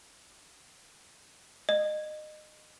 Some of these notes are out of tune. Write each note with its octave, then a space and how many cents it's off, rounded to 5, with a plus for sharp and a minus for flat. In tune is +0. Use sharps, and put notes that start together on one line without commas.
D#5 -25